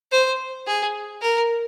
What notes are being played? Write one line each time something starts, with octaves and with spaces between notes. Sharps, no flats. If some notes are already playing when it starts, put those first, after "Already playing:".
C5
G#4
A#4